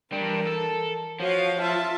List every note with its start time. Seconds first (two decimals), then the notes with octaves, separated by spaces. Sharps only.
0.13 E3 G3 D4 A#4
0.47 A4
1.20 F3 F#4 C#5 F5
1.60 F4 E5 A5